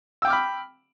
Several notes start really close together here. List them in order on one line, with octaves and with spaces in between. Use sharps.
E6 G5 D6 F6 B5